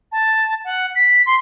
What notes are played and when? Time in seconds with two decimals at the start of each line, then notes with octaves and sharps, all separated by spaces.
0.12 A5
0.65 F#5
0.95 B6
1.26 C6